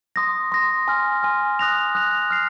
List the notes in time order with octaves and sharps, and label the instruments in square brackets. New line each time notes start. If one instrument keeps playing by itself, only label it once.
[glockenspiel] C6 D#6 A#6
C6 D#6 A#6
G#5 C6 F6
G#5 C6 F6
D#6 F#6 A#6 F7
D#6 F#6 A#6 F7
F6 C7 F7